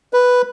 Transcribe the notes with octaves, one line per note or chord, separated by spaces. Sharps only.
B4